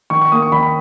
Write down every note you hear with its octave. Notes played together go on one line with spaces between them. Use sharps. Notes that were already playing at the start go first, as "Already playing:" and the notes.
D#3 C#6
C#6
A#3 D#6
C#6
D#3 B5
B5